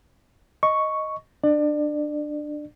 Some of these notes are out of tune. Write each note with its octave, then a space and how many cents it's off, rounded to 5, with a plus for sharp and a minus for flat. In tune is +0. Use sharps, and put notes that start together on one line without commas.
D#5 +0 C#6 +0
D4 +15 D5 +30